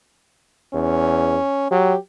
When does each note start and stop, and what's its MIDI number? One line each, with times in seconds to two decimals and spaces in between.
0.74 1.37 40
0.74 1.66 61
1.71 1.94 54
1.71 1.97 67